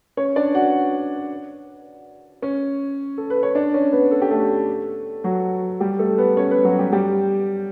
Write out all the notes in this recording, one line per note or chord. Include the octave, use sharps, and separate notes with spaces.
C#4 C#5
D4 D5
F#4 F#5
C#4 C#5
A4
B4
C#5
D4 D5
C#4 C#5
B3 B4
A4
G4
A3 A4
F#3 F#4
G3 G4
A3 A4
B3 B4
C#4 C#5
B3 B4
F#3 F#4
G3 G4
G3 G4